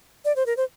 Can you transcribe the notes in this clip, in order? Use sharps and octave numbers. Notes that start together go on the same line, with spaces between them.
D5
C5
A#4
C5